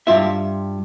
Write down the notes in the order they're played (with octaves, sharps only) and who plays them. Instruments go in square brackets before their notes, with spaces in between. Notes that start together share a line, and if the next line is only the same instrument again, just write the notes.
[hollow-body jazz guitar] G2 F4 E5